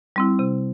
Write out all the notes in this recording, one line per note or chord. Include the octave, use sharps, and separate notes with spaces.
G3 C4 E4
C3